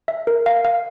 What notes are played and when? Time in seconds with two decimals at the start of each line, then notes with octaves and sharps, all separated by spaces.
0.08 E5
0.27 A#4
0.46 F5
0.65 F5